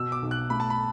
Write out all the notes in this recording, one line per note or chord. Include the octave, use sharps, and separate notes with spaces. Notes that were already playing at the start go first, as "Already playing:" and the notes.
Already playing: B2 E6
D6
B1
F#6
A3 B5
A5
B5